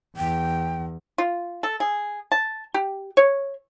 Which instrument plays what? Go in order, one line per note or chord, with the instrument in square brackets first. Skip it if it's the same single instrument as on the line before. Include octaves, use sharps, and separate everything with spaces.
[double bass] E2 [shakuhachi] G5
[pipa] F4
A4
G#4
A5
G4
C#5